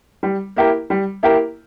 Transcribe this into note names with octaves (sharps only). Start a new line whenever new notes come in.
G3
A#3 E4 G4 A#4
G3
A#3 E4 G4 A#4